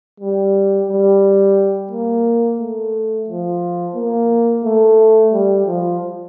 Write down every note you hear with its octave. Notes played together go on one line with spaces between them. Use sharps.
G3
G3
A#3
A3
F3
A#3
A3
G3
F3